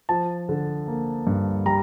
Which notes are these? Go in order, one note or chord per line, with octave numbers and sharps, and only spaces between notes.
F3 A5
D3
A#3
G2
G3 A#5